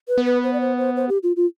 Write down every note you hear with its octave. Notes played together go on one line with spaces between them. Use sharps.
B4
B3
B4
C5
D5
C5
C5
C5
G4
F4
F4